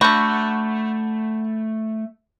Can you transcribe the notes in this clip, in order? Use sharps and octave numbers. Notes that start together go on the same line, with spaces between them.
D3 A3 F#4 B5 G6